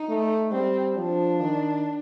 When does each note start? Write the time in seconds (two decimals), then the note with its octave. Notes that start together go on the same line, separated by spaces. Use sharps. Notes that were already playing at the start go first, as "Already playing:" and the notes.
Already playing: D#4
0.09 A3
0.52 G3 C4
0.97 F3 D4
1.41 D#3